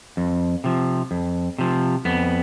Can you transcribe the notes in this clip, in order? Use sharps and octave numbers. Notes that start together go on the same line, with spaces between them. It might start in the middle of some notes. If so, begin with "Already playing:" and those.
F2
C3 F3
F2
C3 F3
F2 B3